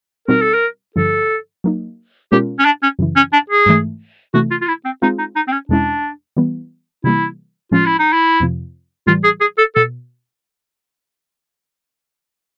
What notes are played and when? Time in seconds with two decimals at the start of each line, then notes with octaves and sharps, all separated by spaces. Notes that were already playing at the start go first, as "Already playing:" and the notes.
0.28 B2 G3 C4 D#4 F#4 A#4
0.42 A4
0.54 A#4
0.96 G2 D3 F3 A4
1.64 F#3 A#3 D#4
2.32 B2 G#3 C#4 F4 G4 A#4
2.59 C#4
2.65 D4
2.83 C#4
2.99 F#2 C#3 E3
3.16 C#4
3.33 D4
3.50 G#4
3.66 G#2 E3 A3
4.34 C3 E3 A3 F#4
4.51 F4
4.61 F4
4.68 E4
4.85 C4
5.02 G#3 C4 D#4 F4 G#4
5.19 D#4
5.36 D#4
5.47 C4
5.52 C#4
5.69 E2 B2 G#3 C#4 D4 E4
6.37 E3 G3 B3
7.04 C3 E3 G3 A#3 E4
7.71 A2 F3 G#3 C#4 F4
7.86 E4
7.99 D#4
8.13 E4
8.40 F2 C3 F3
9.07 A2 E3 G3 F4
9.24 G#4
9.41 G#4
9.58 A4
9.75 B2 A4